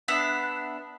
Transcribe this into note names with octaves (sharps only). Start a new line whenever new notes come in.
B3 D4 E5 F#5